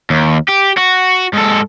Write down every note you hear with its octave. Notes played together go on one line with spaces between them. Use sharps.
D#2
G4
F#4
G#2 A4